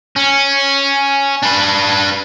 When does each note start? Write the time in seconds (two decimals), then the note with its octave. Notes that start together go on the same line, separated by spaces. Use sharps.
0.16 C#4
1.43 D4 B4